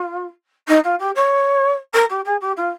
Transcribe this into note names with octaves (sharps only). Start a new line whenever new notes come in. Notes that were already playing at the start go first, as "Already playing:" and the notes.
Already playing: F4
D#4
F4
G4
C#5
A#4
G4
G#4
G4
F4